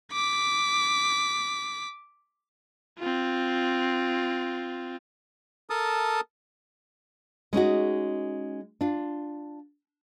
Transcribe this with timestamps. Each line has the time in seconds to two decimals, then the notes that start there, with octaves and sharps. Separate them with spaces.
0.12 D6 B6
2.98 C4 F4
5.70 A4 A#4 A5 D#6
7.53 G#3 C#4 D#4 F#4
8.81 D4 F4